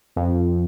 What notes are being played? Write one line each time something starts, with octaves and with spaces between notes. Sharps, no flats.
F2